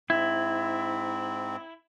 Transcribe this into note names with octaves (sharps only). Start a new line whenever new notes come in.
G#2 C4 E4